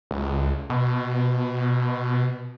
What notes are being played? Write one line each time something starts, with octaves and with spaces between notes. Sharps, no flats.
C#2
B2